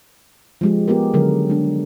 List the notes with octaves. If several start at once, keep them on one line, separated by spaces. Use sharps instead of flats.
F3 G#3 G4
B3 G4 G#4 A#4
D3 D#3 F#3 A#4
G#3 D4